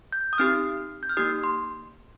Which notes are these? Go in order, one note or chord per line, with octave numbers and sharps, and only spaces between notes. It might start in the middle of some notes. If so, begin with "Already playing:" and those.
G6
D#6
C4 D#4 G4 F6
G6
F6
A#3 D#4 G4 D#6
C6